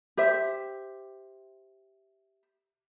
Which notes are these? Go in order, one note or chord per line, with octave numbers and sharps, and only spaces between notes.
G4 C5 E5